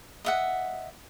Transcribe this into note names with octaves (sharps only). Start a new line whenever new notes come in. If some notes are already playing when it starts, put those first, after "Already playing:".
D#5 E5 F#5